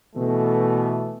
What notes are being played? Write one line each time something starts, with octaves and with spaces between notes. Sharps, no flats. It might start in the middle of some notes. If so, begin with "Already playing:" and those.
B2 E3 A3